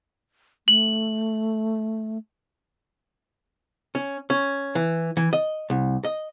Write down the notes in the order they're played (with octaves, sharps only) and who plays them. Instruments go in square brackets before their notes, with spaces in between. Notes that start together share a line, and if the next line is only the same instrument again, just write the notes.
[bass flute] A3 [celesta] F#7
[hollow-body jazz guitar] C#4
C#4
E3
E3
D#5
C2
D#5